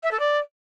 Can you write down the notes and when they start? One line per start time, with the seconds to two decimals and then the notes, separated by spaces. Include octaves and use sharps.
0.03 E5
0.11 A4
0.19 D5